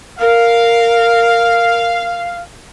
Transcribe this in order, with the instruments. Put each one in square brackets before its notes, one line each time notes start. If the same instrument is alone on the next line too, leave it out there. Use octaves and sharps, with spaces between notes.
[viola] A#4 [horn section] F5